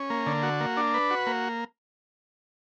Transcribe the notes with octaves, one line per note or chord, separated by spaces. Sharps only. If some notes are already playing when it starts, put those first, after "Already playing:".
Already playing: C#4
A#3
D3
F#4
A#3
D4
B4
F#4
A#3